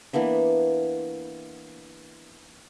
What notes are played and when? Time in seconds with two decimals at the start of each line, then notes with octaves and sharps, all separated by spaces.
0.13 E3 A#3 B3 D4